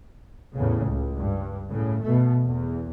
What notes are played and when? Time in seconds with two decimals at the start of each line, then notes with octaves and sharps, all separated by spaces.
0.55 E2 A2 C#3
0.85 C#2
1.17 G2
1.69 A2 C#3
2.03 B2 A3
2.45 E2